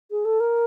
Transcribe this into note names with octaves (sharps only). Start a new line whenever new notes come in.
G#4
A4
A#4